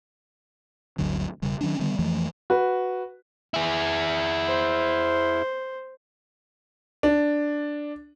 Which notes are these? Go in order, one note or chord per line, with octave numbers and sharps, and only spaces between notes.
G1 D2 D3 F#3
E1 C#3 G3
D#3 F#3 C#4 D4
D3 D#3 G3 B3
F2 E3 F3 A3
F#4 B4
E4 G#4
C5
D4